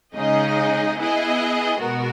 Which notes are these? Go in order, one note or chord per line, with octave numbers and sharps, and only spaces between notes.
C#3 G#3 D#4 G#4 D#5
B3 E4 G#4 D#5
B2 G#3 B3 F#4 A#4